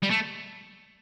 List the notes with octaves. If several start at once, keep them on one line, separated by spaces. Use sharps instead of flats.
G3
A3